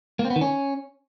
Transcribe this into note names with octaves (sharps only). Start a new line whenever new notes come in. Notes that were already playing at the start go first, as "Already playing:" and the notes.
A#3
C4
B3
D#3
C#4